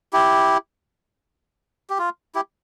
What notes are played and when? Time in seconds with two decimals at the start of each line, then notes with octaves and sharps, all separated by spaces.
0.13 E4 G4
1.90 G4
1.98 F4
2.35 E4 G4